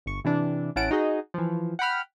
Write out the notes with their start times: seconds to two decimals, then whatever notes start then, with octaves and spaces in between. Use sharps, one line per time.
0.06 G1 C#6
0.25 C3 E3 D4
0.76 A1 C#4 E4 F#5 A5 D7
0.91 D#4 F#4 G#4 D#5
1.34 E3 F3
1.79 F#5 G5 B5 F6